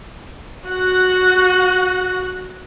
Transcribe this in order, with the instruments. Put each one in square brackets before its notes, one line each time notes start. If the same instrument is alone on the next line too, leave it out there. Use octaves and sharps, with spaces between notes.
[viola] F#4 F#5